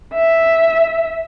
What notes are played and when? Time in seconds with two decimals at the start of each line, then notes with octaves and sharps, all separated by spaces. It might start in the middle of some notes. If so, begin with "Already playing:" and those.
0.14 E5